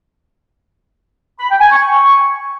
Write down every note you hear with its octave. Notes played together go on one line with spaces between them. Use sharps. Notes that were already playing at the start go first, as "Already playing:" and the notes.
B5
G5
G#5
C#6